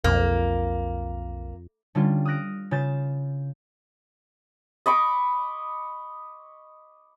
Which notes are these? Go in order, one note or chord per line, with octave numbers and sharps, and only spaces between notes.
B1 F2 A#3
D3 G3 C#4 F4
D#6 F6 F#6 A#6 D7
C#3 F4 G6 A6 E7
D#5 B5 C#6 D6